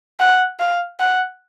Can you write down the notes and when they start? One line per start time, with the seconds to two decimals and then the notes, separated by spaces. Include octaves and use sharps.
0.20 F#5
0.60 F5
0.99 F#5